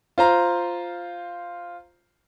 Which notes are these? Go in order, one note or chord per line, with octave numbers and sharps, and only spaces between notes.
F4 C5 A#5